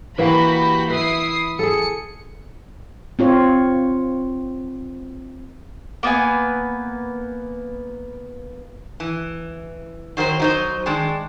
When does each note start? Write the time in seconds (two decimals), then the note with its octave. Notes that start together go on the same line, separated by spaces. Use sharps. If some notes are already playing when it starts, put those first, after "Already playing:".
0.18 E3 A#3 F#4 G4 B5
0.90 E4 B4 D#6 C7
1.59 G#4 A4 C#7
3.19 C4 F4 C#5
6.03 A#3 B3 B4 G#5
9.00 E3
10.17 D#3 F#3 A#4 C5
10.39 F#3 D#4 C5
10.86 D#3 G#3 D4